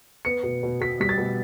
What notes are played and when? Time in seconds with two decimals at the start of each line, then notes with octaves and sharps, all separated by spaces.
0.25 B3 C#7
0.43 B2
0.63 B2
0.81 B2 B6
1.00 G3 B6
1.09 A6
1.18 B2